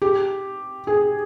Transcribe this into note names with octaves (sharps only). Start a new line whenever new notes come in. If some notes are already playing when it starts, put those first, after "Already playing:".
G4
G#4